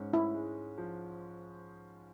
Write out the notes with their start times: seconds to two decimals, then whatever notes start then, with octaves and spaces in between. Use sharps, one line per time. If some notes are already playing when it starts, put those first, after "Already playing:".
Already playing: G#2 C#4
0.13 E4
0.34 G#3
0.78 F3